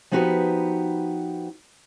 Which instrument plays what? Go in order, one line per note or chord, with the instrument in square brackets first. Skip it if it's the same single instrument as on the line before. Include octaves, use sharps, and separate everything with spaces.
[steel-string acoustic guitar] F3 B3 D#4 F#4 G4 B4